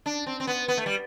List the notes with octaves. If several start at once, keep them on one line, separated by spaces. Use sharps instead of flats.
D4
C4
C4
B3
B3
A3
G3